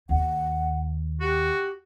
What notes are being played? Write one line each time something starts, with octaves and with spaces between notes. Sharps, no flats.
D#2 F#5
F#4 G4